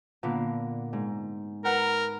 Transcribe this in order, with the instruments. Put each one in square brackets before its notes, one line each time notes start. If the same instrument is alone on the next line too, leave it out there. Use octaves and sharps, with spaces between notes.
[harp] A#2 D3 B3
G#2
[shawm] A#4 [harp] B4 F#5 A#5